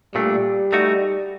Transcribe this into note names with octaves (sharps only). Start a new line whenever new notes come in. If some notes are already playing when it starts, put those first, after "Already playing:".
A#2 G3 A3 D4
A3 D#4 F#4